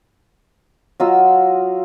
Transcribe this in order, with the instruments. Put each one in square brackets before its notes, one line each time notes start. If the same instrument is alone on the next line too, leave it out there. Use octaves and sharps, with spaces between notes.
[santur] F#3 F4 D#5 E6